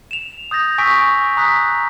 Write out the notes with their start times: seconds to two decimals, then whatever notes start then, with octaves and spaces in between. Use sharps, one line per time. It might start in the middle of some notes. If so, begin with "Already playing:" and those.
0.11 E7 F7
0.51 D#6 G6 A6 A#6
0.78 G#5 C#6 D#6 E6 B6 D7
1.37 A#5 D#6 F#6 B6